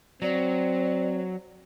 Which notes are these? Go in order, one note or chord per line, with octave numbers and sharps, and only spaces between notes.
F#3 C4 D5